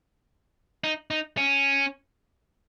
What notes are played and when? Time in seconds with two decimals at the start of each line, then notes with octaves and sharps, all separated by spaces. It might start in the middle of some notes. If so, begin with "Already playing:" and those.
0.84 D#4
1.11 D#4
1.37 C#4